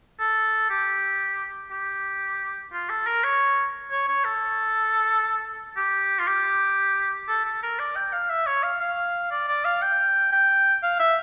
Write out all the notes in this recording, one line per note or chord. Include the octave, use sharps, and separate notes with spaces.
A4
G4
G4
F4
A4
A#4
C#5
C#5
C#5
A4
G4
F4
G4
A4
A4
A#4
D5
G5
F5
E5
C#5
F5
F5
D5
D5
F5
G5
G5
F5
E5